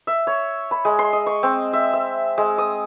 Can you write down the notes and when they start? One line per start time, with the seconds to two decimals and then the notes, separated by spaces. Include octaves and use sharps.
0.07 E5
0.27 C#5
0.71 B5
0.85 G#3
0.99 C6
1.13 D#5
1.26 C#6
1.43 C4
1.73 E5
1.93 E5
2.38 G#3
2.58 D#6